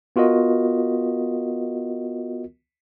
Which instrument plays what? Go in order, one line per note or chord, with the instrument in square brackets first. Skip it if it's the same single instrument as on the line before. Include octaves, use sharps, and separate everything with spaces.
[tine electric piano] B3 F4 F#4 A#4 D#5